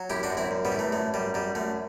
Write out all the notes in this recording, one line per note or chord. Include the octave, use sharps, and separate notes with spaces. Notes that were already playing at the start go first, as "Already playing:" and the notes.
Already playing: F#3
F#2 E4 G4
D4 F#4
F#2
C4 E4
F#2
G3 B3
E3
A3
F#2 A3
F#2 G3
F#2 G3
F#2 A3